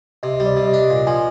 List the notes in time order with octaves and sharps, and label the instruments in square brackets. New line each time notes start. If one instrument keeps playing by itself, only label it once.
[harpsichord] C3 [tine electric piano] D#5
[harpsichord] G3
[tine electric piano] D5
[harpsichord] C3
[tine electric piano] D#5
[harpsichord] D4
A#2
[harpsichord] F3 [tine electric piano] G#5